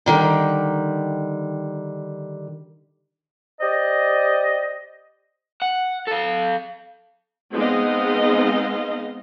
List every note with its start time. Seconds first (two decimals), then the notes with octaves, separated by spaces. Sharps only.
0.06 D3 D#3 G3
3.61 G4 C5 D5 D#5
5.62 F#5
6.08 A4 F5
7.52 G#3 B3 C4 D#4 D#5 F5